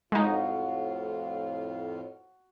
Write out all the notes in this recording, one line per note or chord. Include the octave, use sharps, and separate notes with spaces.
F2 A2 G#3 D#4 F4 F#4